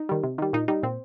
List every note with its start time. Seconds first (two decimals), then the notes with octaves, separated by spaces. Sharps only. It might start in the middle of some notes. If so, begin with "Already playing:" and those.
Already playing: D#4
0.09 D#3 G3
0.23 C3
0.38 D#3 G3
0.53 A#2 D#4
0.68 G3 D#4
0.83 A#2 C4